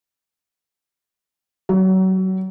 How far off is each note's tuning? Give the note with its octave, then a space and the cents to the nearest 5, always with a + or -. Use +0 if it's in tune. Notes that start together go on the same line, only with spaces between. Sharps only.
F#3 +30